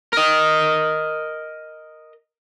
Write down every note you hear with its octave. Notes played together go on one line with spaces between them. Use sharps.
A#4 D#5